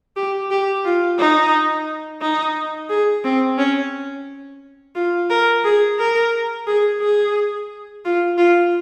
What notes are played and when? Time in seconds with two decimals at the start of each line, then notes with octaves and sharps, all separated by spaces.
0.16 G4
0.51 G4
0.85 F4
1.19 D#4
2.21 D#4
2.90 G#4
3.25 C4
3.58 C#4
4.95 F4
5.30 A#4
5.64 G#4
5.99 A#4
6.67 G#4
7.02 G#4
8.05 F4
8.38 F4